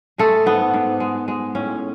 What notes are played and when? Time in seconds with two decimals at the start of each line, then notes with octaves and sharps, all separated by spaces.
0.18 G#3 A3 A4
0.46 G#2 B3
0.74 G#2
1.00 G#3
1.28 G#3
1.55 A2 C#4